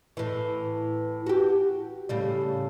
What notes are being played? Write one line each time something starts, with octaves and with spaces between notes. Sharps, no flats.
A2 E3
F#4 G4
A2 C#3 G3